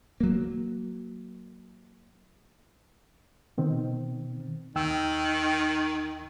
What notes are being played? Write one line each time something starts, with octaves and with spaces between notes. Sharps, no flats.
F#3 A#3
B2 D#3 C4
D#2 D#3 G5 E6